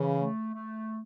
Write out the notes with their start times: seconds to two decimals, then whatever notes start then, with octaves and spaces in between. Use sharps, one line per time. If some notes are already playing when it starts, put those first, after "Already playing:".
Already playing: C#3 E3
0.18 A3
0.54 A3